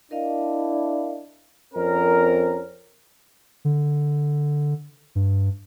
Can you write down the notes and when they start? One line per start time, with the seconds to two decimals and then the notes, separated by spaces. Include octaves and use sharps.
0.11 D4 E4 A#4 D#5 F5
1.74 F2 C4 C#4 A#4
3.65 D3
5.15 G2